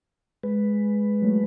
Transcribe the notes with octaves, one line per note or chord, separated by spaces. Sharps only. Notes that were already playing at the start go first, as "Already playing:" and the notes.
G#3 B4
F#3 A3